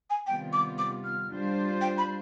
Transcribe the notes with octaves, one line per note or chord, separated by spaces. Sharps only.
G#5
C3 D#3 G3 B3 F4 G5
D6
D6
F6
G3 D4 F4 C5
G5
B5